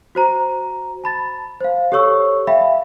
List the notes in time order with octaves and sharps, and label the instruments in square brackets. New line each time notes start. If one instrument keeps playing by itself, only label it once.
[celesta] F#4 C5 A#5
A5 B5 A6
C5 F5
G4 A4 C#5 C#6 E6
E5 F5 G5 B5